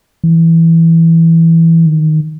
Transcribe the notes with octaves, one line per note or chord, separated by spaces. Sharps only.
E3
D#3